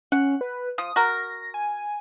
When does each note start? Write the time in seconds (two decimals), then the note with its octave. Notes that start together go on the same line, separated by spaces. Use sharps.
0.12 C#4 F#5
0.41 B4
0.78 F3 D#6
0.96 F#4 A#4 A#6
1.54 G#5